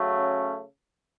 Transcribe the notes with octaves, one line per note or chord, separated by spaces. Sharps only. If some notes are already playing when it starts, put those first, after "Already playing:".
Already playing: C#3 F#3 A3
C#4